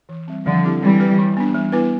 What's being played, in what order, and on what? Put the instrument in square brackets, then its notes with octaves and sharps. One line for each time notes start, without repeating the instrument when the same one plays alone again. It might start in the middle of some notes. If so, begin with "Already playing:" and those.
[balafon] E3
G3 C4
[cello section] D3 F3 [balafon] G3
[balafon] C4 E4 G4
[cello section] E3 G3 [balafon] C4
[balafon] G4 B4
E3
B3 D4
G3
B3 E4 B4